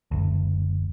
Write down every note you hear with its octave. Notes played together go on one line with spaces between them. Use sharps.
F#1 D2